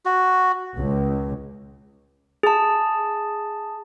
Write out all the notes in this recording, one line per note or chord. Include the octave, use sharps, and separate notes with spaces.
F#4
C#2
G#4 A5